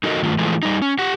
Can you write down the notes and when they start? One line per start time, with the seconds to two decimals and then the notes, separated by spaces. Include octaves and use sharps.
0.04 D#4 F#4 A4 A#4 D#5
0.23 G2 D#3 A3 F4
0.39 E3 F3 G#3 A3
0.63 G3 D#4
0.82 C#4
0.99 G4 F#5